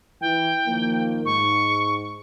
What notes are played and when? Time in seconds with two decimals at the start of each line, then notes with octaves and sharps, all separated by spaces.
0.21 E3 G5
0.67 D#3 F3 A#3
1.25 G#2 C#6